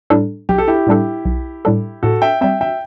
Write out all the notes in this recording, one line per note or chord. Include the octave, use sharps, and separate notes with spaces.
A2 G3 D4 A4
B1 G4
A4
E4 G4
A2 G3 D4 A4
B1
A2 G3 D4 A4
A2 F#4 A4
E5 G5
G3 C4 E5 G5
E5 G5